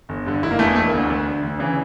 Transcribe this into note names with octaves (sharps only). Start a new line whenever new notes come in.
G1
G2 D3
F1 E4
A#3
E2 E3 A3
A#3
E1 A3
A#3
D2 D3
D2
D3
D2
C#3 E3